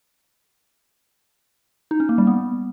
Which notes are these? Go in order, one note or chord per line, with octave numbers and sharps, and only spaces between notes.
D#4
C#4
A#3
G3
B3